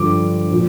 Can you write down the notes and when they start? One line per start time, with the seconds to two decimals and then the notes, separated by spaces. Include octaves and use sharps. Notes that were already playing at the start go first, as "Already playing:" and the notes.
Already playing: G2 D3 F3 D6
0.51 A#2 F3